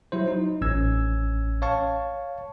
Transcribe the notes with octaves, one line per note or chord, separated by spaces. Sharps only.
F#3 E4 C5
D#4
A1 C#4 E6 G#6
C#5 F5 A5 C#6